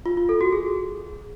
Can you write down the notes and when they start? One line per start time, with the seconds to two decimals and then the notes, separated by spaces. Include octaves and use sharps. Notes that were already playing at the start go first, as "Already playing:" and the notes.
0.06 F4
0.17 F4
0.29 A4
0.41 F#4
0.52 G#4